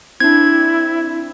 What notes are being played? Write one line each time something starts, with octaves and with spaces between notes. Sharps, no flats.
C4 D4 E4 G#6